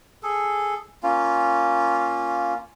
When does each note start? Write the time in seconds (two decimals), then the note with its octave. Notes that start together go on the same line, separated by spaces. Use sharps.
0.23 G#4 A4
1.03 A#3 C#4 F4